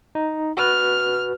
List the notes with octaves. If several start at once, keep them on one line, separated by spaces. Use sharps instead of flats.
D#4
F#4 B4 F6